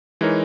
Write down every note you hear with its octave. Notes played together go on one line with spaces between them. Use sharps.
E3 G#3 D#4 A#4 C#5